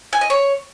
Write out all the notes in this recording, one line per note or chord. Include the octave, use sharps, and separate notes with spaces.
G#5
D#5
C#5